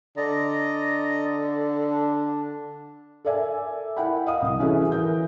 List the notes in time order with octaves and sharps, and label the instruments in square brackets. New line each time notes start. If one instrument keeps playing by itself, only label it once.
[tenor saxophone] D3 [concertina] D5 D#5 A#5
[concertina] D4
[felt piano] A4 A#4 D5 E5 G#5
E4 A#4 F#5 G5 B5
D#5 F5 D#6
C2
E3 C#4 E4 F#4 G#4 A4
E3 A#4 G6